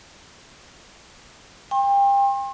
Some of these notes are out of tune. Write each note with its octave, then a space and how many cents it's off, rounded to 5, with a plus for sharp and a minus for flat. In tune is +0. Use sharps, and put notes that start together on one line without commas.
G5 +30 C6 +40